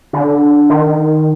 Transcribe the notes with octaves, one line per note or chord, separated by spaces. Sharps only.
D3
D#3